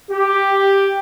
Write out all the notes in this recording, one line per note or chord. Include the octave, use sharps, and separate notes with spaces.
G4